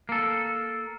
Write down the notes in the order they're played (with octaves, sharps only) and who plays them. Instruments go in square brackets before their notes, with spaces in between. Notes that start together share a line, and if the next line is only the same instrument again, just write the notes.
[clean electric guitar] A#3 A4